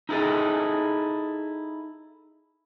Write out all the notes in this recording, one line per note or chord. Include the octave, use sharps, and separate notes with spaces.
D#4 E4 G#4 A4 D#5